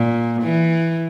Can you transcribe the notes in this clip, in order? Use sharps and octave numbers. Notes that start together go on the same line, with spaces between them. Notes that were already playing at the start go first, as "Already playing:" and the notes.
Already playing: A#2
E3